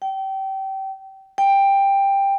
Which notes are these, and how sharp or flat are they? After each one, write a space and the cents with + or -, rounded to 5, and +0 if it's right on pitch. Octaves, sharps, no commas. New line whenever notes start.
G5 -25
G5 +10